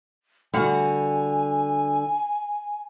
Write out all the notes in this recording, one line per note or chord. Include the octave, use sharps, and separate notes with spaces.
D3 G3 F#4 F#5 G#5